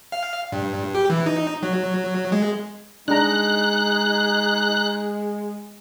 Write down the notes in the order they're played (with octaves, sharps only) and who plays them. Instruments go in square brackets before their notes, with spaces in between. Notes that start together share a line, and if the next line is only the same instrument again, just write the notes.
[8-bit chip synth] F5
G2
G4
E3
D#4
F#3
G#3
[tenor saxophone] G#3 [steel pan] D4 A#5 [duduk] D#4 [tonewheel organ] F#6